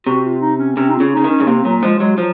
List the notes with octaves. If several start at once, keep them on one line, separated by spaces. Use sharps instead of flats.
C3 F#4
F4
D#4
C#4
C3 C#4
D#4
F4
C#3
C#3 D#4
D#3
C#4
C#3
C3 A#3
A#2 F#3
F3 G#3
F#3 G#3
F3 F#3